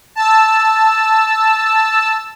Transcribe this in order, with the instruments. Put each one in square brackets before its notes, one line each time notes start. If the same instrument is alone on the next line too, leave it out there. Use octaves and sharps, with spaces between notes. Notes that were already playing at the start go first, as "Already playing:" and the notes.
[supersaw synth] A5 E6